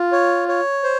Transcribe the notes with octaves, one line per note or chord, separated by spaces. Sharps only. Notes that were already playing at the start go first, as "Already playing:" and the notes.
Already playing: F4
C#5
C#5
C5